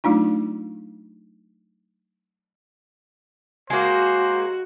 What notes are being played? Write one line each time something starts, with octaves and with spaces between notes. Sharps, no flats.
F#3 A3 D4 D#4 F4
G#3 A#3 F#4 C5